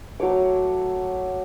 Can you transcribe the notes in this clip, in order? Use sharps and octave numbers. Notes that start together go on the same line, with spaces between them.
F#3 A3 C#5 D6